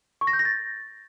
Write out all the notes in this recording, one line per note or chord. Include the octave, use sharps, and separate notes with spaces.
C#6
A#6
G6
A#6
A6